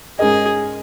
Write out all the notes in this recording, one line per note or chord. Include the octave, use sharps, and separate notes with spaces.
G#2 G#3 C#4 G#4 A#4 D#5